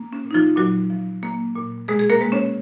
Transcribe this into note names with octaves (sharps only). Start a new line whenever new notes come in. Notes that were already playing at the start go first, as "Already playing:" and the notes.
Already playing: A#3
C#4
A#2
D#4
F3 F4
A#2 F#3 F#4
F3
A#3
A#2
B2 G#3 G#4
G#4
A#3 A#4
G#3 B4
C#4 C#5